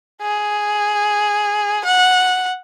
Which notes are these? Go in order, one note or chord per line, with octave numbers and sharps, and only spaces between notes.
G#4
F#5